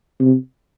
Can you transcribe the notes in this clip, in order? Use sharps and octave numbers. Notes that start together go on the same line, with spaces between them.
C3